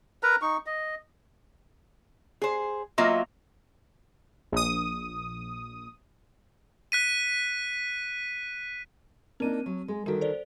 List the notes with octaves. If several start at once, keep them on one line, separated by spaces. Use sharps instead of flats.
A#4 B4 A#5
D#4 C#6
D#5
G#4 C5
F#3 A#3 F4 D#5 E5
A#1 D#6
F#6 B6 D#7
A#3 C4 D4 D#4 D#7
F#3
G#3
D3 D#3 G3 F#4
A4 C5 D5